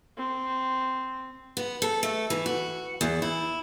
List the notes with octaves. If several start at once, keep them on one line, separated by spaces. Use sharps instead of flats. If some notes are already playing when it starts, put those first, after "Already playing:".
C4
B3
A4
A3
E3
F#4
E2
E4